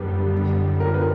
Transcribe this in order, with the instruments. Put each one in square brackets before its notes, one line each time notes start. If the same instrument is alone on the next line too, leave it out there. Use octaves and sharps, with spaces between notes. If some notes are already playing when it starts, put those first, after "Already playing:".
Already playing: [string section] F#2 D3 G3 B3 [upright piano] G4 A#4 B4
[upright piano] A#4
B4